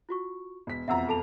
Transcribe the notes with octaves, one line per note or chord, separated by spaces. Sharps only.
F4 F#4 C#6
E1 B6
E1 F2 E5 F#5 A#5 E6
A4 A5 F7